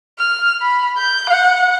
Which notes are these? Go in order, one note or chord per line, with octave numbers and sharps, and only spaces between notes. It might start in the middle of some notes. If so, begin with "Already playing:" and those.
F6
B5
G6
F#5